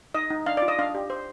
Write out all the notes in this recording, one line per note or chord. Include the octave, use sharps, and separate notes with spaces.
D#4 D#5
D#4
D4 F5
D5
F4
D#5
D4 F5
G4
C5